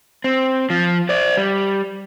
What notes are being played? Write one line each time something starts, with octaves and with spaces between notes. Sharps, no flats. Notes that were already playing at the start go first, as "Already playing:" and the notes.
C4
F3
C5 D5
G3